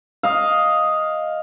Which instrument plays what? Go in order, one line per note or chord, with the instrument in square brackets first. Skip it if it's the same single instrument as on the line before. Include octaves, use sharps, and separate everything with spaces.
[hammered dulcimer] D#5 F5